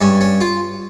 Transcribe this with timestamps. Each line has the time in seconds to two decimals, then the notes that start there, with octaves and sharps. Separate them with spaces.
0.01 G2 C#4
0.21 C#4
0.41 F4